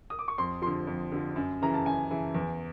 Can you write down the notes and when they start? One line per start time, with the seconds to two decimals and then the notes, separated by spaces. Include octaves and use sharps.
0.10 D#6
0.19 D6
0.28 C#6
0.38 F2 C6
0.62 D3 F3 C6
0.87 F2
1.12 D3 F3
1.36 F#2
1.61 C#3 E3 A#5
1.74 A5
1.86 F#2 G#5
2.11 C#3 E3
2.35 E2